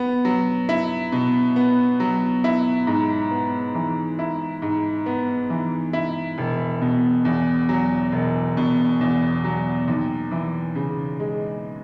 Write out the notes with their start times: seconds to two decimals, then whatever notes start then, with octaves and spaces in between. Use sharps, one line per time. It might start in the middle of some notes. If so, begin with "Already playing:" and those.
Already playing: B3
0.25 F#3
0.69 E4
1.12 B2
1.56 B3
2.00 F#3
2.44 E4
2.87 G#2
3.31 B3
3.75 E3
4.19 E4
4.62 G#2
5.06 B3
5.50 E3
5.93 E4
6.38 E1
6.82 B2
7.25 E2
7.69 F#3
8.12 E1
8.57 B2
9.01 E2
9.44 F#3
9.88 D#2
10.32 E3
10.75 C#3
11.20 G#3